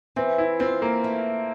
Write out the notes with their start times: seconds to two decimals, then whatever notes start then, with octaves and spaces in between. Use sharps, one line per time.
0.16 E3 C4
0.38 E4
0.60 C4 F4
0.82 A#3
1.04 A3